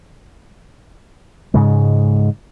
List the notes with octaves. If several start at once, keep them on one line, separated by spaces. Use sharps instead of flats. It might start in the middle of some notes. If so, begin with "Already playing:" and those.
G#2 C#3 G#3